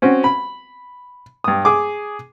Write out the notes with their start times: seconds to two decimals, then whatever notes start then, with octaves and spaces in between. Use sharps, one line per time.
0.02 C4 C#4 F#4
0.24 B5
1.44 G2 D#6
1.65 G#4 D6